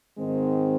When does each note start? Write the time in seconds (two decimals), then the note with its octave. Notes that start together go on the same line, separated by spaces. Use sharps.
0.18 G#2 D#3 G#3 C4